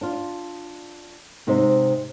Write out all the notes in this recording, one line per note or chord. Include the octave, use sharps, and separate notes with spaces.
D4 F4
G#2 C3 D#4 C5 D#5